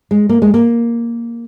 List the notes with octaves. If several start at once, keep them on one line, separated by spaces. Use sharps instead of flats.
G#3
A#3
G#3
A#3